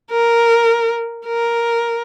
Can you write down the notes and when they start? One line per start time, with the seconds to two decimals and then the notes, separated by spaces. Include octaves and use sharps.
0.10 A#4
1.26 A#4